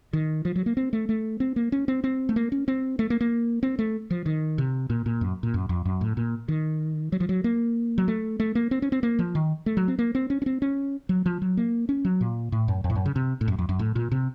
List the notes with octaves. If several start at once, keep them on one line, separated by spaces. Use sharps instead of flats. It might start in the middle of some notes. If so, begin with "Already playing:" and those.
D#3
F3
F#3
A#3
C4
A3
A3
C4
A#3
C#4
C4
C4
A3
A#3
C#4
C4
A3
A#3
A#3
C4
A3
F3
D#3
C3
A#2
A#2
F#2
A#2
F#2
F2
F#2
A2
A#2
D#3
F#3
F3
F#3
A#3
F#3
A3
A3
A#3
C4
C#4
C4
A#3
F3
D#3
A3
F#3
C4
A#3
C4
C#4
C#4
C4
C#4
F#3
F3
F#3
A#3
C#4
F#3
A#2
A2
F#2
F2
A2
F#2
C#3
C3
A2
F#2
F2
F#2
A2
A#2
C3